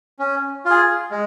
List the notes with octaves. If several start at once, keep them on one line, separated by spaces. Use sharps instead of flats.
C#4
F4 G#4
G#3